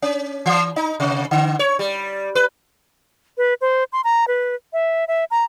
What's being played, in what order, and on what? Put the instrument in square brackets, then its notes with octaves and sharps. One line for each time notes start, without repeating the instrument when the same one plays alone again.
[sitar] C#4
E3
D#4
C3
D3
C#5
G3
B4
[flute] B4
C5
C6
A#5
B4
E5
E5
A#5